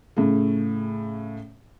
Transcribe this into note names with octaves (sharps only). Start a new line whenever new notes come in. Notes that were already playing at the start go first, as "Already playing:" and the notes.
A2 C#3